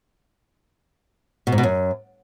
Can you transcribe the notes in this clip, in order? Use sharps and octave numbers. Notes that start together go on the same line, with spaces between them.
B2
G#2
B2
F#2